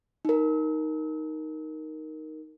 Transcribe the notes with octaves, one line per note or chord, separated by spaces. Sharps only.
D#4 A#4